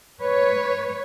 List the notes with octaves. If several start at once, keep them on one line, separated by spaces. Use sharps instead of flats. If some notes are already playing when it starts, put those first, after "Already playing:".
B4 C#5